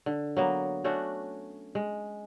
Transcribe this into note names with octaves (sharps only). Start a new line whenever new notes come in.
D3
F#3 A#3 B3
A3 C#4 D4 F#4
G#3